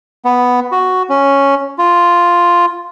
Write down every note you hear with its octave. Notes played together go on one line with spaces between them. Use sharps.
B3
F#4
C#4
F4